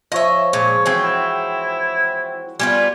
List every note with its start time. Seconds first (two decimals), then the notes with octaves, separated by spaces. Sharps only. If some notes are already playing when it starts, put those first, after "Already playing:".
0.12 F3 C#5 D#5 E5
0.53 A#2 G#3 C#5
0.86 E3 C4 F#4 G#4 G5 G#5
1.03 E4
2.59 G3 B3 F4 D5 G#5